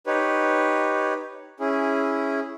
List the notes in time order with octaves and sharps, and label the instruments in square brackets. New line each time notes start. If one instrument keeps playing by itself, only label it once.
[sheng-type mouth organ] D#4 G4 B4 C#5
C#4 E4 G#4